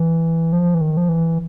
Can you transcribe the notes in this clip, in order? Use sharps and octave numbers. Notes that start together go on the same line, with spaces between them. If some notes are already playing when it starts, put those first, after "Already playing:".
Already playing: E3
F3
E3
D#3
F3
E3